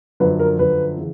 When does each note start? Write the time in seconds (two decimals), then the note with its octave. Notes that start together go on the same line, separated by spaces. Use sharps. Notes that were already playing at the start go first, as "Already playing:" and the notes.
0.20 F#2 D3 F3 B4
0.39 A#4
0.59 F#2 D3 F3 B4
0.97 C#3 E3